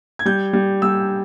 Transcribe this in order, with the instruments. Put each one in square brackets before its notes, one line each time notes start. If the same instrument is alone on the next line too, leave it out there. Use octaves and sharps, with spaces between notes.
[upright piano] G#6
G3 G6
G3
G3 E6